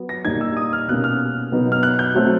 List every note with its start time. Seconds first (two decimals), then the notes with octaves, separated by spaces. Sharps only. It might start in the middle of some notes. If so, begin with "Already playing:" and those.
Already playing: F#3 B3
0.09 A#6
0.25 A#2 G3 A#3 D#4 G#6
0.41 E6
0.57 D#6
0.73 F6
0.88 B2 G3 A#3 C#4 F#6
1.04 F6
1.52 B2 F#3 B3 D#4
1.72 F6
1.83 F#6
1.99 G6
2.15 F#3 A3 C4